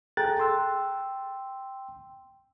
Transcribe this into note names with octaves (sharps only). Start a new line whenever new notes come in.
G#4 A4 G5 A#5 F#6 A6
G5 C6 E6